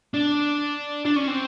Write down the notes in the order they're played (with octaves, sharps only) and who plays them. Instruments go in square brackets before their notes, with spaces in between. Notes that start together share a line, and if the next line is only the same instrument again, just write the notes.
[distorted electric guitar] D4
D4
C#4
C4